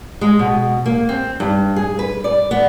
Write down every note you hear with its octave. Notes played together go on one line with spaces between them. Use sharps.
G#3
B2
A#3
C4
G2
G#4
B4
D5
B3